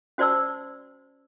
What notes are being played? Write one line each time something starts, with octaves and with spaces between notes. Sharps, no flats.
C#4 F#4 C5 D5 A5 E6